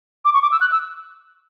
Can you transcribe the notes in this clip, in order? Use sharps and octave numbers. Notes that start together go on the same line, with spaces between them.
D6
C#6
D6
E6
F#6
E6